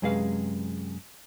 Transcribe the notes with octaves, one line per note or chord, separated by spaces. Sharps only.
F#2 C3 G#3 G#4 B4 F5